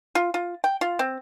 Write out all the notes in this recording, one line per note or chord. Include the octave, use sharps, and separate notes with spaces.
F4
F4
G5
F4
C4